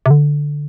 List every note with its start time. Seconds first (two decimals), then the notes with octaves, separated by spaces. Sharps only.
0.06 C3
0.11 D3